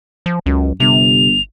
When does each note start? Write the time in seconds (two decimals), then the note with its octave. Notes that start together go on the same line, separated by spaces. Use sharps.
0.26 F3
0.46 C#2 F#2
0.80 G1 C3 F7